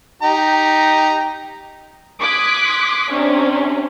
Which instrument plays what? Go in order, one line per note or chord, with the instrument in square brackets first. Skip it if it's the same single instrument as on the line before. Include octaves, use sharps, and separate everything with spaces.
[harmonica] D#4 G4 A#5
[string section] C6 D6 D#6 F#6 G#6 B6
C3 C#4 D4